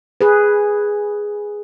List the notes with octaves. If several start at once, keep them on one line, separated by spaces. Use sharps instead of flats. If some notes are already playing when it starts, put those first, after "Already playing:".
G#4 B4